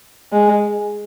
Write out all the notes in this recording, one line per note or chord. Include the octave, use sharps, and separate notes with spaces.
G#3